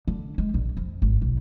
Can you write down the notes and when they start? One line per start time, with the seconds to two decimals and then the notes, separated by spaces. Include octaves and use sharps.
0.08 D3
0.38 G#3
0.54 A#1
0.77 F2
1.02 G#1
1.22 B1